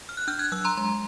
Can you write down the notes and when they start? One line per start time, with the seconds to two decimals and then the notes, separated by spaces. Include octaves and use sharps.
0.09 F6
0.17 F#6
0.28 D4 F6 G6
0.39 F#6 G#6
0.52 F#3 E6 F#6
0.65 A#5 C6
0.77 G#3 A#5 C6